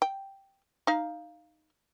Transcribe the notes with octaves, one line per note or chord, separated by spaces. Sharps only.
G5
D#4 F5